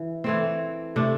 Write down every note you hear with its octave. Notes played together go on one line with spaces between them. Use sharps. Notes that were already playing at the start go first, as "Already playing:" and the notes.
Already playing: E3
E3 A3 C4
C3 A3 D4